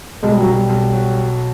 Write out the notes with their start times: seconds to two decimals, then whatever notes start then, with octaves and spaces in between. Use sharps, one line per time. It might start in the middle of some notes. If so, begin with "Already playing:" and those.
0.23 B1 G#3
0.31 G3
0.40 F#3
0.46 B1 G3
0.69 B1
0.93 F#3